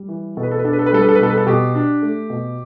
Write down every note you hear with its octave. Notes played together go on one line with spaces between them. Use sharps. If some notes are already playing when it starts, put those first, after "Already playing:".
Already playing: G3
E3
B2 A4
B4
A4
B4
D4 A4
B4
A4
B4
G3 A4
B4
A4
B4
B2 A4
B4
A4
B2 G4
D4
A3
B2